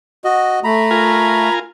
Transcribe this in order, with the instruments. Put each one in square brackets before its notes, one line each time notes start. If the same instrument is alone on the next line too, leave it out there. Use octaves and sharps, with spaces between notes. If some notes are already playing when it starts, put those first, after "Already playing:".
[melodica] F#4 D#5
[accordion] A3 [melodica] A#5 B5
[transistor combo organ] F4 A#4 G#5